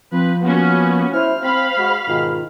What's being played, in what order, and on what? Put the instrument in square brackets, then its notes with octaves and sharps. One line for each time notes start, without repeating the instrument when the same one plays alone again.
[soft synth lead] F3 [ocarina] C4 [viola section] B4
[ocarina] A#3 [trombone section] B3 [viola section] C#4 F#4
[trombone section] E4 [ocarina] C5 [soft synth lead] F6
[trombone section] C4 [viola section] F5 B5
[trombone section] G#3 F#4
[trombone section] G#2 B2 D#3 [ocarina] F4